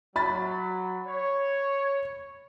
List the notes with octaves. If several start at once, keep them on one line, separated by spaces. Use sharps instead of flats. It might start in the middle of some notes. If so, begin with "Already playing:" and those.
F#3 B5 A6
C#5